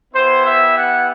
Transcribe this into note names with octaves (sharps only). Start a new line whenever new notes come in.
B3 E4 G4 C5
E5
F#5